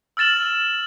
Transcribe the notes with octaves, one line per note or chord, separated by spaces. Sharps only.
E6 F6 A6 E7 F#7